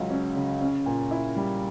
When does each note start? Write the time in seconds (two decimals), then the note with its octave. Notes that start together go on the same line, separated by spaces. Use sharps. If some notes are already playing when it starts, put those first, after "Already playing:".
Already playing: C#2 C#3 F#3 C#4
0.10 C#4
0.36 C#3
0.61 C#4
0.86 A#2
1.11 E4
1.36 G3